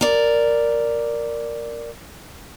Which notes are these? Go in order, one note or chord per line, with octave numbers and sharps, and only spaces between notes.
A#4 D5